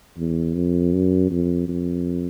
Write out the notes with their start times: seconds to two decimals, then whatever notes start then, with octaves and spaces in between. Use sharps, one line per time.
0.18 E2
0.55 F2
0.94 F#2
1.31 F2
1.68 F2